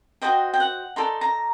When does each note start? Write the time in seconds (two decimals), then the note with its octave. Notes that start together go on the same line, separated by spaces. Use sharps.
0.22 F#4 A4 C5 D#5 G5
0.54 G5
0.60 F#5
0.96 D#4 A4 D5 C6
1.21 A#5